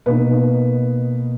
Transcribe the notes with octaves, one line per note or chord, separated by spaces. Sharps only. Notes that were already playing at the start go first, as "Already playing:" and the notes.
B2 A#3 D#4 B4